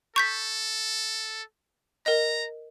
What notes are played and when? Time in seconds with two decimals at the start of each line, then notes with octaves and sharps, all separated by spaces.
0.16 A4 C#6 G6 B6
2.06 A#4 D#5 A#5